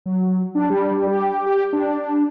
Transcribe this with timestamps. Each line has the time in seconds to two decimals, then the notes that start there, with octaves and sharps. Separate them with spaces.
0.06 F#3
0.55 D4
0.70 G3
1.07 G4
1.46 G4
1.73 D4